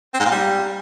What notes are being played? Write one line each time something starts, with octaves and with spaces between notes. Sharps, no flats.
C4
G#2
A#2
G3